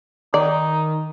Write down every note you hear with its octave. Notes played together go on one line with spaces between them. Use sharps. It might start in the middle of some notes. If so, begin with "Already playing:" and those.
D#3 D#4 D5